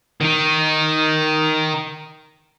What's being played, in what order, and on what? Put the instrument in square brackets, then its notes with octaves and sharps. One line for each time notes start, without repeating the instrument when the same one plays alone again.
[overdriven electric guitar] D#3 D#4